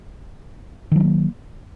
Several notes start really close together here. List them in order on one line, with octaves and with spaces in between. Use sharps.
D#3 F#3 D4 A#3